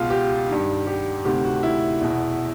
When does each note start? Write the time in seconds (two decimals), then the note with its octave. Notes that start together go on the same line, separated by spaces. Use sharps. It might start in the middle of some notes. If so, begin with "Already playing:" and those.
Already playing: C#2 B2 F4
0.10 G4
0.49 G2 D#3
0.87 G4
1.25 D2 C3 D#3 G4
1.44 F#4
1.63 E4
2.01 E2 B2